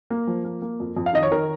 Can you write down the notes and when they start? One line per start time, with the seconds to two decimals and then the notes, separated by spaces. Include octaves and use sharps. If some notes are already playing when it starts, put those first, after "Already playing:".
0.10 A#3
0.27 F3
0.45 A#3
0.62 A#3
0.80 F2
0.97 F2
1.06 F5
1.13 D#3 D#5
1.23 C#5
1.31 D#3 A#4